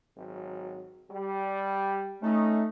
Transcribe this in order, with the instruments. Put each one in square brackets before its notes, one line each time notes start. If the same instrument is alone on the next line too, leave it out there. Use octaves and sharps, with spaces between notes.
[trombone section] G#1 F#3
G3
[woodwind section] A3 [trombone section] C#4 D#4